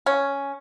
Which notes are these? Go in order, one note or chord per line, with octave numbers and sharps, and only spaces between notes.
C#4